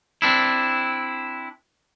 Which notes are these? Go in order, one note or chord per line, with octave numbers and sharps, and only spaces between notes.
C4 D4 E4